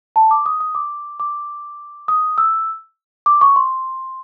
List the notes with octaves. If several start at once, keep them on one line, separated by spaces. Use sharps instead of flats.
A5
D6
D#6
D#6
D6
D6
D#6
E6
D6
C#6
C6